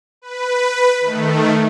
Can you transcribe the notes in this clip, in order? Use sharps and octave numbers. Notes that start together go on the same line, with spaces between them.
B4
D#3 A3